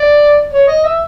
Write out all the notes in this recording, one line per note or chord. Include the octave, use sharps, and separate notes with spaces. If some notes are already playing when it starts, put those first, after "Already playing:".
Already playing: D5
C#5
D#5
E5